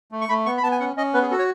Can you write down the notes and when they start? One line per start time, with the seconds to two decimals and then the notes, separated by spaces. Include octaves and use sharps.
0.12 A3
0.21 C#6
0.29 A3 B5
0.46 B3 C#6
0.58 B5
0.63 B3 A5
0.72 G#5
0.80 C#4 F#5
0.96 C#4 D#5
1.14 B3 B4
1.22 G#4
1.31 F#4 A4
1.39 C#5